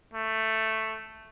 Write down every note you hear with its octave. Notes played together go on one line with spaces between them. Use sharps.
A3